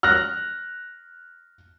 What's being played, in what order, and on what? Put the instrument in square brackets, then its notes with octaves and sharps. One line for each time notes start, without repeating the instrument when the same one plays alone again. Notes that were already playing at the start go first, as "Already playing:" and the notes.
[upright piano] F6 F#6 A#6